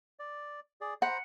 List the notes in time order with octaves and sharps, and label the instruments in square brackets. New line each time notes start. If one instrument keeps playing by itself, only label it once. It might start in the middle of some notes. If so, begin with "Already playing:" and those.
[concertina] D5
G#4 D5
[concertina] C5 A#5 B5 [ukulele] F#5